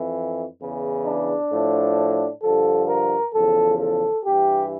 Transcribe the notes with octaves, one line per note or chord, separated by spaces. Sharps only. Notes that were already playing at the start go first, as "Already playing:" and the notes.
Already playing: F2 E3
E2 C#3 E3
D4
A2 F3
G2 D3 F3 A4
A#4
E2 C#3 F3 A4
A4
G2 E3 G4